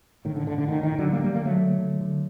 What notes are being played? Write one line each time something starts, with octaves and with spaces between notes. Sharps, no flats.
A2 D#3
D3
A2 D3
D3
A2 D#3
D#3
A2
D3 F#3
D3 G3 A#3
G3 A#3
D3 G3 A#3
F#3 A3
D3
D3
D3